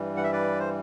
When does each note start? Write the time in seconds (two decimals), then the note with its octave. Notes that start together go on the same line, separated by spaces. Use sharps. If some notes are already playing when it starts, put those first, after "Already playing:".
Already playing: G2 E3 G3
0.17 F#5
0.24 E5
0.32 B4 D5
0.60 C5